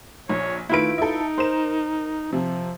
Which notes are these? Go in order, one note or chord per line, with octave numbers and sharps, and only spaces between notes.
A#1 C#5
D#3 A3 E4 F4 B4 D7
D#4 A4 E5
A#4 C5 E7
C3 F3